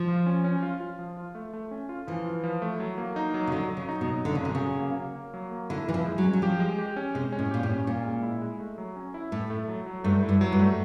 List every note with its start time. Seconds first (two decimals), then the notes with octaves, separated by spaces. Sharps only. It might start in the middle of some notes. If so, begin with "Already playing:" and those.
Already playing: F3
0.08 F4
0.26 C#4
0.44 C#4
0.63 F4
0.80 F4
0.99 F3
1.17 F4
1.35 A3
1.53 A3
1.71 C#4
1.89 F4
2.07 E3 F3
2.26 F4
2.44 F3
2.62 A3
2.80 F#3
2.98 A#3
3.16 D#4
3.34 F#3
3.47 C#3
3.52 D3 F#3
3.70 F#3
3.77 C#3
3.89 D#4
4.01 B2
4.06 F#3
4.25 D3 F#3
4.35 C#3
4.43 C3 F#3
4.55 C#3
4.62 F#3
4.79 A#3
4.97 A#3
5.16 A#3
5.34 F#3
5.52 A#3
5.70 D3 E4
5.88 E3 E4
5.94 F3
6.06 G#3
6.18 F#3
6.24 C#4
6.33 F#3
6.42 F3 G4
6.60 G#3
6.79 G4
6.96 C#4
7.15 C3 G#3
7.32 C#4
7.39 A2
7.51 A#2 G4
7.63 A2
7.69 C#4
7.87 A#2 C#4
8.05 G#3
8.23 E4
8.41 G#3
8.60 A3
8.78 F#3
8.96 C#4
9.14 E4
9.32 A2 A3
9.50 A3
9.68 F#3
9.86 F#3
10.04 G2 A3
10.23 E4
10.29 G2
10.41 F#3
10.52 G2
10.59 A3